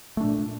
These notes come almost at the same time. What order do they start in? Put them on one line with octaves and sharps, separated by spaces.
A3 D4 A#2